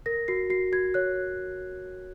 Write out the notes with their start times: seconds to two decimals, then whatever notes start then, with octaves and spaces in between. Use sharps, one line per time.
0.06 A#4 A#6
0.28 F#4 C7
0.50 F#4 C7
0.72 F#4 G#6
0.94 C#5 F#6